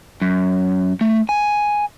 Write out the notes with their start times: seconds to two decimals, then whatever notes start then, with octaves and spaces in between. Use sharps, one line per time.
0.22 F#2
1.01 A3
1.29 G#5